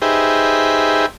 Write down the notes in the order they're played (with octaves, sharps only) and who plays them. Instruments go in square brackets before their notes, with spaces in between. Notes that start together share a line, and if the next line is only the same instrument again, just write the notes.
[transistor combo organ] D#4 G4 G#4 B4 C5 E5